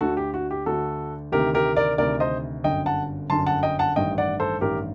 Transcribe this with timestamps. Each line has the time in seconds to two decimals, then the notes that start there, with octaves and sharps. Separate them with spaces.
0.01 D2 D3 F#4 A4
0.17 G4
0.34 F#4
0.51 G4
0.66 D2 D3 F#4 A4
1.32 D2 C3 D#3 G4 A#4
1.54 G4 A#4
1.76 A#4 D5
1.98 D2 C3 D#3 A#4 D5
2.20 C5 D#5
2.64 G1 F#2 D3 D#5 G5
2.86 F#5 A5
3.30 G1 F#2 D3 A5 C6
3.46 F#5 A5
3.63 D#5 G5
3.79 F#5 A5
3.96 A1 G2 D#3 D#5 G5
4.18 D5 F#5
4.40 A4 C5
4.61 A1 G2 D#3 G4 A#4